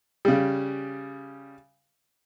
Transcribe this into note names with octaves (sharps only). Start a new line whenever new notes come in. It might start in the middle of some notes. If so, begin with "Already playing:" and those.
C#3 G3